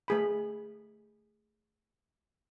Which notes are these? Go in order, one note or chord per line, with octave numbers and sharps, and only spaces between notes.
A3 G#4 B5